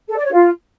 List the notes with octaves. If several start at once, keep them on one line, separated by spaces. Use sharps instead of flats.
A4
D5
C#5
F4